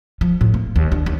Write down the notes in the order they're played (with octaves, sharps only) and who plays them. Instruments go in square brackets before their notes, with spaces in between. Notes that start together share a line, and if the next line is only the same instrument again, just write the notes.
[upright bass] F3
A2
A#3
D#2
D4
D#2